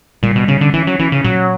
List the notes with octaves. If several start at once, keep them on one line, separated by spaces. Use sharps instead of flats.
A#2 G3
B2
C#3 C#4
D3
E3 C#4
F#3
E3 C#4
C#3
A#2 F#3